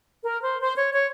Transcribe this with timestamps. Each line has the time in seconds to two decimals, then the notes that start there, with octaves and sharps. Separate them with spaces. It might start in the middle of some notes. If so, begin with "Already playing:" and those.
0.23 A#4
0.41 C5
0.60 C5
0.75 C#5
0.93 C#5